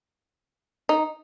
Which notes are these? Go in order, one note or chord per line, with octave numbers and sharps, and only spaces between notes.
D#4